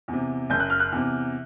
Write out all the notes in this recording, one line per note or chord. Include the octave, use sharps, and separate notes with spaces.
E2 C3
F#1 G6
F#6
F6
F#6
E2 C3